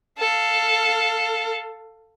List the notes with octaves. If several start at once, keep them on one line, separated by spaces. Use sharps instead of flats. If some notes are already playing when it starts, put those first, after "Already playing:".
A4 F5